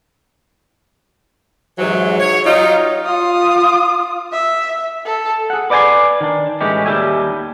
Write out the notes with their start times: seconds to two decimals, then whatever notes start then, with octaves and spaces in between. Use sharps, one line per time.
1.78 G#2 C3 E3 F#3
2.19 C#5
2.44 F#3 G3 D#4 F4
3.05 F4 D#6
4.32 E5
5.06 A4
5.50 G#4 F#5
5.70 B4 D5 D#5 G5 G#5 C6
6.21 D#3 D4
6.61 A2 E3 G#3 C#4 G4
6.86 D#2 G3 G4 E5 G#5